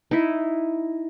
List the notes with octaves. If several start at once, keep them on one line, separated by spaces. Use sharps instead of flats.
D#4 E4